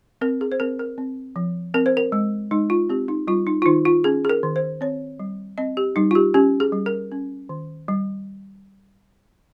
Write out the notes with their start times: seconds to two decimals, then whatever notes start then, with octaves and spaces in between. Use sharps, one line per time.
0.21 C4 A#4
0.41 G#4
0.52 C5
0.60 C4 A#4
0.79 A#4
0.98 C4
1.36 F3
1.74 C4 A#4
1.86 C5
1.97 A#4
2.12 G#3
2.51 G#3 D#4
2.70 F4
2.89 C4 G4
3.08 D#4
3.28 G3 F4
3.47 D#4
3.62 F4
3.66 D#3 D#4
3.85 F4
4.04 C#4 G#4
4.25 G#4
4.29 A#4
4.43 D#3
4.56 C5
4.81 C4 C#5
5.20 G3
5.58 C4 D#5
5.77 G4
5.96 G3 D#4
6.11 F4
6.15 G4
6.34 C#4 G4
6.60 G#4
6.72 G3
6.86 A#4
7.12 C#4
7.49 D#3
7.88 G3